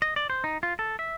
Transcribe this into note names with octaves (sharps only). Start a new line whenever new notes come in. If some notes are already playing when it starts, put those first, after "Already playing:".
D#5
D5
C5
D#4
F4
A4
E5